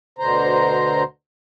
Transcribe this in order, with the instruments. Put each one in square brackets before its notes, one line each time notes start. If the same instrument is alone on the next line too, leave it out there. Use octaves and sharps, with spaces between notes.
[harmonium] D2 B2 D3 C5 A#5